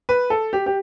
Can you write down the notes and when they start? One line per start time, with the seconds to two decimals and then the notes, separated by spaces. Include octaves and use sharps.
0.09 B4
0.30 A4
0.53 G4
0.66 G4